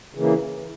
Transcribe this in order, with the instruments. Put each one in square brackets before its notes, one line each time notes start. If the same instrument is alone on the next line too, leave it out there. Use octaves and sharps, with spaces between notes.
[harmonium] C#3 E3 A#3